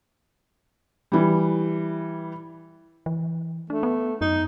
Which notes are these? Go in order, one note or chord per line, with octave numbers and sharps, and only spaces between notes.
E3 G3
E3
A3 D4
B3
F#2 D#4